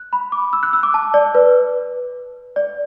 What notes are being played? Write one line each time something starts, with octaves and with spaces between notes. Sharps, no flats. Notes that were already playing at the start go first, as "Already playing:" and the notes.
Already playing: F#6
B5
D6
E6
F#6
E6
D6
A5
D5
B4
D5